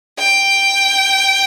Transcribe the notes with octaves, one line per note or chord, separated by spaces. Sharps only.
G5